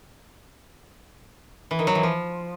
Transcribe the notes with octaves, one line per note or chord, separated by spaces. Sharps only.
E3
D#3
F#3
E3
F3